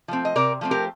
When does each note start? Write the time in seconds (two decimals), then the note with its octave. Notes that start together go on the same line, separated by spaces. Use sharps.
0.08 F3 A3 C4
0.25 D#5
0.36 C3 A#4 D5
0.61 F3 A3 C4
0.71 G4 A#4